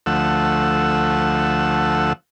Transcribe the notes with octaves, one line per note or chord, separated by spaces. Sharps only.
D2 F3 A3 F#5 E6